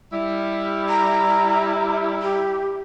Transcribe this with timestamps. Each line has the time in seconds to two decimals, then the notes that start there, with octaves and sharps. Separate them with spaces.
0.12 G3 E4
0.89 A#5
2.22 G4